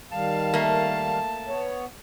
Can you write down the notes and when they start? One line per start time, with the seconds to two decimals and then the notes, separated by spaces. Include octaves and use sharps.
0.12 D#3 G3 F5 A5
0.54 A3 A#3
1.48 B3 C#5